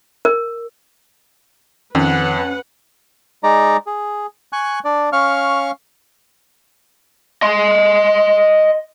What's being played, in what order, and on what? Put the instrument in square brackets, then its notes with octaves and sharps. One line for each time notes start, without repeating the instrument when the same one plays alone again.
[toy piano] A#4
[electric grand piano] F2 [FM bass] D#3 [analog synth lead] C#4 [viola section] B4 F#5
[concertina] G#3 D#4 D5 A#5
G#4
G#5 C#6 F#6
D4 D5
C#4 F5 C#6 F6
[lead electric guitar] D#5 C6